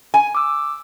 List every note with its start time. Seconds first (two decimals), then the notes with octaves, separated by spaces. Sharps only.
0.14 G#5
0.35 D6 E6